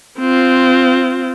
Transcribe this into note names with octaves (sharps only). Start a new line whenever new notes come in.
C4 F4